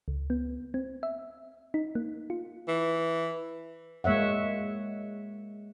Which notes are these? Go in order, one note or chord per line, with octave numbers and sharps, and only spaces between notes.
C#2
B3
C4
E5
D#4
A#3
F4
E3
G#3 A#3 C#5 E5 F#5